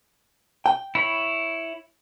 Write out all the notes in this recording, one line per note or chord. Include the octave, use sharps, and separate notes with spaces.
G5
E4 C#5 B5